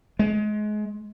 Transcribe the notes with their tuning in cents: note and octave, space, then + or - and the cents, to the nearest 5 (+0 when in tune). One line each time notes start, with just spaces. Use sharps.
G#3 +30